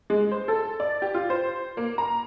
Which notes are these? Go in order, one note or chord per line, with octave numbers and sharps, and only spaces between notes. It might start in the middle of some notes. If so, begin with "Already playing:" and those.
G#3
C5
A4
D5
G4
F4
C5
A#3
A#5